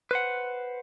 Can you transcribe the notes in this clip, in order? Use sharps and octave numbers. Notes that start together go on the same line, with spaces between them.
B4 C5 F#5